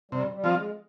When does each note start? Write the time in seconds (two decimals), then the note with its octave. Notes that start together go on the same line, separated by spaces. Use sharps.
0.11 C3 G3
0.34 G3
0.44 F3 C4 F4
0.55 G#3